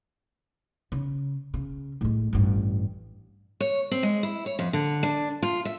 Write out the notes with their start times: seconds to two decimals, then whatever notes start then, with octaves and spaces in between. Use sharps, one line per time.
0.92 C#3
1.54 C#3
2.01 A2 G#3
2.33 A1 G2
3.60 C#5
3.91 C4
4.03 G#3
4.23 E4
4.46 C#5
4.59 F2
4.73 D3
5.03 D4
5.43 F4
5.65 E5